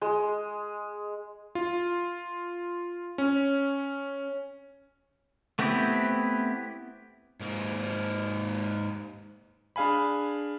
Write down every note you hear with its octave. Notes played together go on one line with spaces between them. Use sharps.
G#3
F4
C#4
A3 B3 C4 E4 G4
G#2 A#3
D4 G#4 F5 G#5 B5